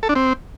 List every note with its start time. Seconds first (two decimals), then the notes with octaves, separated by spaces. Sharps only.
0.03 A4
0.09 D4
0.15 C4